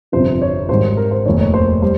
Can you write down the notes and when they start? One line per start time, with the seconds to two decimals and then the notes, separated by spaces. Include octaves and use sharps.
0.12 G1 F2 C3 F3 C5
0.42 C#5
0.69 G#1 G#2 D#3 G3 C5
0.97 A#4
1.11 C5
1.26 F1 D#2 D#3 C#5
1.41 C#5
1.54 C5
1.82 G3 C5